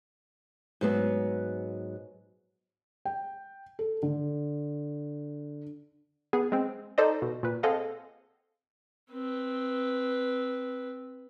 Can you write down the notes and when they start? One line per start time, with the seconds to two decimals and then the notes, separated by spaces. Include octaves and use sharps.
0.81 G#2 F#3 B3
3.05 G5
3.79 A4
4.03 D3
6.33 B3 G#4
6.52 G#3 C4
6.98 D#4 A4 C5 D5 D#5
7.22 B2
7.43 A#2 B4
7.63 C4 G#4 A4 D#5 F5 F#5
9.12 C4 B4